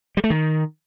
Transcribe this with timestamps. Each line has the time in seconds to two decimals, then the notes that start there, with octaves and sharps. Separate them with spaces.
0.17 G3
0.24 A3
0.30 D#3